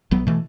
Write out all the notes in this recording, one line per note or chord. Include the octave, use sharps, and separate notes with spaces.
B1 F#3 B3
B2 E3 A3